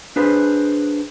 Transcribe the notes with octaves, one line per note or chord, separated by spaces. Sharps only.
D4 G#4 B4 C5